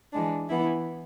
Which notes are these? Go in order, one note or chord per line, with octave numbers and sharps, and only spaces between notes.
E3 G#3 D4
E3 B3 E4